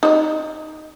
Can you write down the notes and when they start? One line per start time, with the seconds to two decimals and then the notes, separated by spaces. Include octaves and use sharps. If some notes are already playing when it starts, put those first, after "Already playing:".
0.03 D#4 D#5